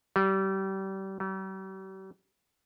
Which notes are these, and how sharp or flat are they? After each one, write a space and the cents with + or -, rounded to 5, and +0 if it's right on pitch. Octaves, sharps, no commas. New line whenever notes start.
G3 -30
G3 -45